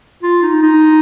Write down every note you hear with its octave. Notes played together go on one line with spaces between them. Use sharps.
F4
D#4
D#4